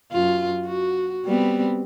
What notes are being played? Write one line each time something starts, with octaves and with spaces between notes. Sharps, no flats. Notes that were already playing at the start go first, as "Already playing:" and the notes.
F#2 F4
F#4
G3 B3 C4